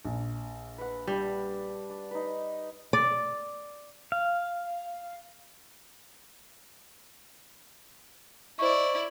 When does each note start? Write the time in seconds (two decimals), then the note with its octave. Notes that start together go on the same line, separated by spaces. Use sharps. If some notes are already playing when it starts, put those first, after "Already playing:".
0.05 A#1
0.78 B4 F#5
1.07 G3 D4
1.90 D4
2.11 D#4 B4
2.93 D5
4.12 F5
8.59 E4 C5 D5 D#5 C#6